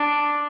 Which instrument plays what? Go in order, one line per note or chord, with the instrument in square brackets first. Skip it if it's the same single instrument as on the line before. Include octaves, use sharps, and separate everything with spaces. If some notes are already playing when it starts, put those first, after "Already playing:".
Already playing: [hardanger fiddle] D4